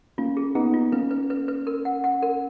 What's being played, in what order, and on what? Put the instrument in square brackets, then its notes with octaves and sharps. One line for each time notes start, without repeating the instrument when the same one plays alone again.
[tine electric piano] A#3 C#4 [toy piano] F4
[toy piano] G#4
[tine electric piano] B3 D#4 [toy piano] G#4
[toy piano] F4
[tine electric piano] A#3 C#4 [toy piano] B4
[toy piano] B4
B4
B4
A#4
F#5
F#5
A#4